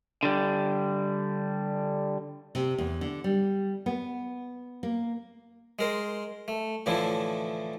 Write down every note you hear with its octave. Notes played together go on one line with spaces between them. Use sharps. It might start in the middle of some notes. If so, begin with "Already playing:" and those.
D3 G3
C3
E2
D3
G3
B3
A#3
G#3 A#4 C5
A3
A2 D3 E3 F3 E4